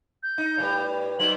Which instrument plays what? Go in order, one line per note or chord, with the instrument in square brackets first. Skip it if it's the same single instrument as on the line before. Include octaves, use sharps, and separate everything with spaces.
[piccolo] G6
[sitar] D#4
A2 G3 B4
[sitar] F#3 D#4 C5 [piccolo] F#7